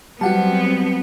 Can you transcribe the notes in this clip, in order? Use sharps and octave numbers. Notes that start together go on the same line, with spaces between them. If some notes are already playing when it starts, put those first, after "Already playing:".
F#3 G3 B3 C4 F#4 F#5 A5